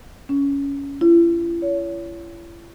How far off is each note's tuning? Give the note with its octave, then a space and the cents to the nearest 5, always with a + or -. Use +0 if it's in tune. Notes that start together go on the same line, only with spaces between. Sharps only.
C#4 +15
E4 +45
C#5 +30